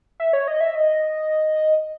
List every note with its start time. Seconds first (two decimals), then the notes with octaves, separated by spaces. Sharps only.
0.20 E5
0.33 C#5
0.48 D#5
0.61 E5
0.75 D#5